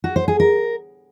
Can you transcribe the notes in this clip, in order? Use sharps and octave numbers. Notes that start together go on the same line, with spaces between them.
F#4
C5
G#4
A#4